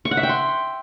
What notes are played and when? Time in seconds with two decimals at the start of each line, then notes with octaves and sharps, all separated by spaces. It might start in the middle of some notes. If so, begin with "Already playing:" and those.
0.05 C#6
0.11 F#5
0.17 E5
0.23 G5
0.29 C6